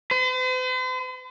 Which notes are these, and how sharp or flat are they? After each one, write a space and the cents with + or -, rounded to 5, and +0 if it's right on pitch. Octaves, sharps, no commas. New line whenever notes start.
C5 -45